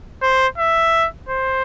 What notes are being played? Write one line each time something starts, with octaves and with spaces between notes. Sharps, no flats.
C5
E5
C5